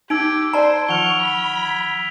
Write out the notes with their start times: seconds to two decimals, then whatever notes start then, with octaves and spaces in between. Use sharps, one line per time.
0.10 D#4 G4 E6 G#6 D7
0.53 C5 D5 A5 A#5 C6
0.89 D#3 F3 F#5 C#6 F6 F7 G7
1.21 B5
1.65 G#6 B6